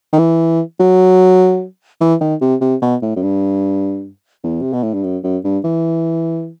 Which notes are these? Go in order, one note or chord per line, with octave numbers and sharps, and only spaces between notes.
D#3
E3
F#3
E3
D#3
C3
C3
B2
A2
F#2
G2
E2
C3
B2
A2
G2
F#2
F#2
G2
E3